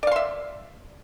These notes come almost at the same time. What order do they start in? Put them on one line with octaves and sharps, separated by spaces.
D5 F5 C6 E5